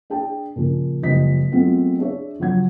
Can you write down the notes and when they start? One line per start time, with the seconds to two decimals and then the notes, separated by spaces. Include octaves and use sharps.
0.10 D4 G#4 G5 A5
0.56 A#2 C#3 F3 A#3
1.02 F#1 F3 G3 D#5 B6
1.52 F#3 G#3 A3 B3 C4 F4
1.99 D4 G#4 C#5 E5
2.38 C#3 F3 F#3 G#6